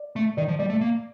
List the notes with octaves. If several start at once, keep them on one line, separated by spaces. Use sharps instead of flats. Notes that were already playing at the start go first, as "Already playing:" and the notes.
Already playing: D5
A3
D#3 D5
F3
G3 D5
A3
A#3